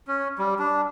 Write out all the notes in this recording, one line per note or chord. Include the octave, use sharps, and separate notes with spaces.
C#4
G3
D4